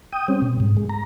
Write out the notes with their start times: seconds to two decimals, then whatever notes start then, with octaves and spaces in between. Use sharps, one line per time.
0.13 G5 D#6
0.28 G3 C4 C#4
0.42 B2
0.60 G#2
0.77 G#3
0.90 A#5